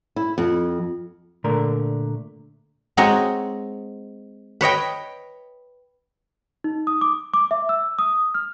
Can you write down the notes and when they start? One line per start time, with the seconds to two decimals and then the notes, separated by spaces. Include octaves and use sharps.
0.16 E4
0.38 F2
1.44 A#2 D3 A3 A#4 A#5
2.97 G#3 C4 D#4 F#4 C#5 D#5
4.61 B4 C#5 D#5 G5
6.64 D#4
6.87 D#6
7.01 D6
7.34 D6
7.51 E5
7.69 E6
7.99 D#6
8.35 F6